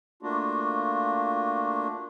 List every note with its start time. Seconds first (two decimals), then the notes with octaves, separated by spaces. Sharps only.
0.22 A3 A#3 D4 F4 F#4